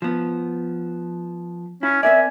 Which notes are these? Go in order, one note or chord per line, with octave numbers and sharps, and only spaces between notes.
F3 B3
C#4 E4
C4 A#4 D5 E5 G#5